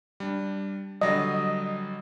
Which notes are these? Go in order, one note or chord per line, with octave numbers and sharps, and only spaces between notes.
G3 D4
D3 F#3 G3 D#5 D#6 A#6